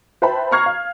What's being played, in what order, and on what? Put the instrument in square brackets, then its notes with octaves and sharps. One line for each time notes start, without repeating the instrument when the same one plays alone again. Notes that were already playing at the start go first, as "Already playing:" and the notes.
[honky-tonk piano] B4 C5 E5 G5 A5 B5
A#5 B5 C#6 F6 G#6 C7
F5